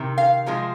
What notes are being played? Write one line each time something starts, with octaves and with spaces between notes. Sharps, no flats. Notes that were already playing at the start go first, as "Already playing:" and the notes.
Already playing: C3 D#3
F5
C3 F3 G#3